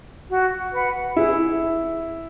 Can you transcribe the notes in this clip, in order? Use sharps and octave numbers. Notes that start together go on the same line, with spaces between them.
F#4
B4 F#5
E4 G#4